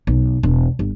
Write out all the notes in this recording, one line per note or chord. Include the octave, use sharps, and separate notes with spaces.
B1
E1
G1